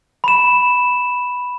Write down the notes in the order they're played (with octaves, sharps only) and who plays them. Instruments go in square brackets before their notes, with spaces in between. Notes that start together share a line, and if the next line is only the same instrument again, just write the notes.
[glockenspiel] B5 E7